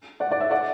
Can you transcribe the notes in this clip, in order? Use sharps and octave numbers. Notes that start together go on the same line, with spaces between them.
D5 F#5
D5 F#5
C#5 E5
D5 F#5